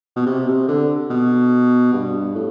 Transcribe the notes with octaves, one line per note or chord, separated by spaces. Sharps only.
B2
C3
C3
D3
B2
G2
A2